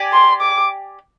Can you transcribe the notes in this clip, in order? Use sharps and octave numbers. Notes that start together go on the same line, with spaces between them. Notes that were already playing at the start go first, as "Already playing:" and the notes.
Already playing: G4 D5 G#5
C6
D6